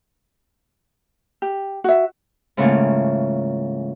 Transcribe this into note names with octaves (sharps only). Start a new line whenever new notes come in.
G4
F#4 E5
G#2 C#3 E3 A3 A#3 F4